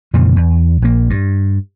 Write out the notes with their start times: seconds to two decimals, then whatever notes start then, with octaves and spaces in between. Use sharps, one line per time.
0.14 F2 A#2 C#3 E3
0.36 E2
0.82 A#1 A#3
1.10 G2